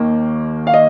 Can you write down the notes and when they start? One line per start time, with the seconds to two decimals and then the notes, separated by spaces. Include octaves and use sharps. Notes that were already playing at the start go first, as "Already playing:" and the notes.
Already playing: D#2 D#3 A#3
0.67 F5
0.74 D#5